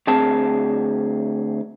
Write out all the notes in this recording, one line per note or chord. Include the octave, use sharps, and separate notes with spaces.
D2 C4 G#4 A5